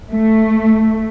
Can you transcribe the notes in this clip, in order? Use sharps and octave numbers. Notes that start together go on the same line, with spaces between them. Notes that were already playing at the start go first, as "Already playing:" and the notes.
A3